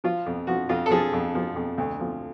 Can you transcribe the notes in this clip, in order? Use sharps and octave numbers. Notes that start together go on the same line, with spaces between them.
F3 F4
F2
F3 F#4
F2 F4
A4
F3 G#4
F2
F3
F2
D2
F3